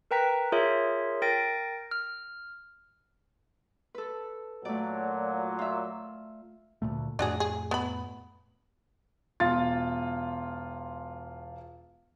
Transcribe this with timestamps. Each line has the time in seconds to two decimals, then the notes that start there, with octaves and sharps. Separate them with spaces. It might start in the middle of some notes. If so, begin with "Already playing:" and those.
0.11 A#4 B4 G5 A#5 B6
0.52 F4 G#4 A#4 C#5 E5
1.22 A#4 G5 A6 A#6 D7
1.91 F6
3.95 A4 B4
4.65 A#2 F#3 A3 D5
5.59 F4 E5
6.82 D2 A#2 A3
7.19 F2 A2 A3 D4 F#4 G#4
7.40 G#4
7.71 B3 B5
9.40 E1 F4 A6